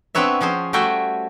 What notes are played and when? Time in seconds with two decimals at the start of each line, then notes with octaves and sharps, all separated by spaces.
0.15 B3 C4 D4 B4 C#5 E5
0.41 F3 C#4 G#4 C5
0.73 G3 A3 F#4 E5 G5 G#5